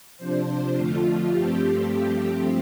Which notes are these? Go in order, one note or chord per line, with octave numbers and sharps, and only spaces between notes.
C3 F3 D4 C5
F2 D3 F3 A3 F4
G2 F3 A3 C4 G4